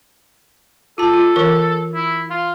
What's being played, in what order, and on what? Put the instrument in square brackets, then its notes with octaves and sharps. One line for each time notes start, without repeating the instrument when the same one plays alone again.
[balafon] F4 A5 [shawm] A4
[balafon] F4
E3 A#4 C#6
[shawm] E4
F4